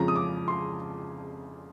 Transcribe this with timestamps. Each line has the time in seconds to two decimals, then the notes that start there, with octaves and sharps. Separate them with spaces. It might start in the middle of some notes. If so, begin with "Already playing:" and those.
Already playing: F2 C#3 F3 G#3 C#4 A#5
0.08 D#6
0.16 D6
0.48 C6